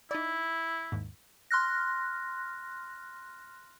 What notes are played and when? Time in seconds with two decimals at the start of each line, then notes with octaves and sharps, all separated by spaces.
0.11 D#4 E4 D5
0.92 D#2 G#2
1.51 C6 F6 F#6 A#6